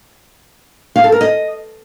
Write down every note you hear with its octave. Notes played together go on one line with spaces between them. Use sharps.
F5
A4
A#4
D#5